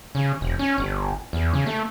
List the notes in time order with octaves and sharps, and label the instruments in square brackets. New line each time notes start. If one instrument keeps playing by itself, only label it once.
[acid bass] C#3
E1
C#4
G1
E2
C#3
A3